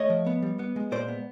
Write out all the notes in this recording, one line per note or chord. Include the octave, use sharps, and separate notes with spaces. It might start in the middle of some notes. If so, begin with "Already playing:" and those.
Already playing: A3 C#5 D#5
F3
B3
G3
B3
G#3
A#2 C5 D5
B3